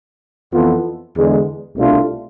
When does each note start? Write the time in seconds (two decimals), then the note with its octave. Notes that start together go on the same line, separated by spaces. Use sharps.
0.52 F2 E3 B3 F4 A4
1.15 E2 D3 G#3
1.76 C2 B2 A3 D4 F4